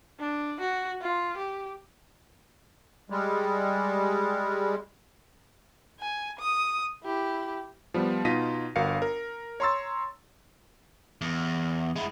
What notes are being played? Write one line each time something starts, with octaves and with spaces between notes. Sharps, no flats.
D4
F#4
F4
G4
G3 G#3
G#5
D#6
E4 G4
F3 G3 B3
B2 D#4 F4 A#6 B6 D#7
G1 F#4 A#4 F5 C7 C#7
A#4
C#5 A#5 C6 C#6 E6 A6
E2
G#3 E4